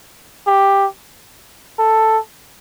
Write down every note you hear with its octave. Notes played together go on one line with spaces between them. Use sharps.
G4
A4